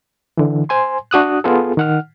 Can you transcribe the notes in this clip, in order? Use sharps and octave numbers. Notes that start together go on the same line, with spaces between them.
D3 E3
C5 G#5 C6
D4 F#4 D#6 F#6
B3 F4 G#4 A4
D#3 F#5 F6